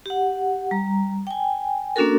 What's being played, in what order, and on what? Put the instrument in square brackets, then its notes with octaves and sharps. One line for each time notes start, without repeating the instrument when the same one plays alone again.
[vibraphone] G4 F#5
G3 A#5
G5 G#5
A#3 C#4 D4 F#4 A4 A#4